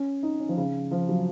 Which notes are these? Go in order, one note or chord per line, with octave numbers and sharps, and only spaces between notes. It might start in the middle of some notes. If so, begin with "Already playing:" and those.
Already playing: C#4
D#4
C#4
F3
C#3
F3
F#3